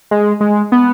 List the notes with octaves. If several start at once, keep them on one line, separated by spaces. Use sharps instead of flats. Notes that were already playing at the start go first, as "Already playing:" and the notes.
G#3
G#3
B3